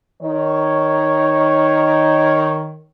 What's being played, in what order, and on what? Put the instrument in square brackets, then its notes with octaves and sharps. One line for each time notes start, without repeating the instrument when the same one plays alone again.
[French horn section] D#3 C#5